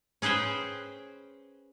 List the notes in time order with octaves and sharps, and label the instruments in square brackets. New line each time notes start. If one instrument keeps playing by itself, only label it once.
[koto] C#4 G#4 B4 C5 G5